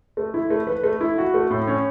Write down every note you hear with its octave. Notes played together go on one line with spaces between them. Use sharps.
A3
E4
A3
B4
A3
E4
F#4
A3
A2
C#4